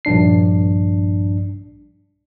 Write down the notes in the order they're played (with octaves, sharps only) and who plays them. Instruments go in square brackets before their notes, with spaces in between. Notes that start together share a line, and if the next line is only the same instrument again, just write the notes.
[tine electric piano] A#1 G2 D4 C7